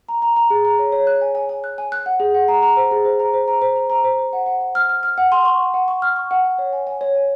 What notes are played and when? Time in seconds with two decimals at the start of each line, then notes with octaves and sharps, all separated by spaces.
0.09 A#5
0.22 A#5
0.36 A#5
0.50 G#4
0.65 A#5
0.79 C#5
0.92 C#5
1.07 F#6
1.21 G#5
1.35 G#5
1.49 G#5
1.64 F#6
1.78 G#5
1.92 F#6
2.06 F#5
2.20 G#4
2.34 F#5
2.48 A#5
2.62 A#5
2.77 C5
2.91 G#4
3.05 C5
3.20 A#5
3.33 C5
3.48 A#5
3.62 C5
3.76 A#5
3.90 A#5
4.04 C5
4.18 C5
4.33 F#5
4.46 F#5
4.61 F#5
4.75 F6
4.89 F6
5.03 F6
5.18 F#5
5.32 C6
5.45 C#6
5.60 F#5
5.74 F#5
5.88 C#6
6.02 F6
6.16 C#6
6.31 F#5
6.45 F#5
6.59 C#5
6.73 G#5
6.87 G#5
7.01 C#5
7.15 G#5